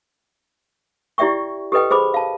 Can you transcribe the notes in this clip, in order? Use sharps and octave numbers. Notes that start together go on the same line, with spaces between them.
E4 G4 D5 E5 G5 C#6
G4 A4 B4 D#5 G5
G#4 C5 B5 D6
F5 A5